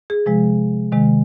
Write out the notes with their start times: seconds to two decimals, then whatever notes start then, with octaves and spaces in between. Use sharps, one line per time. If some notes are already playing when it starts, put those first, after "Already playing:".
0.10 G#4
0.26 C3 F3 G#3
0.92 C3 D#3 G#3